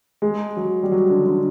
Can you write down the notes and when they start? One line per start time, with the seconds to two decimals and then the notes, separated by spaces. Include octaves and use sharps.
0.22 G#3
0.56 F#3
0.83 G3
0.92 F#3
1.10 D3
1.26 D3